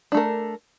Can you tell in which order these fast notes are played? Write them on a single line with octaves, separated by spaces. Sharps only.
D4 A3 A#4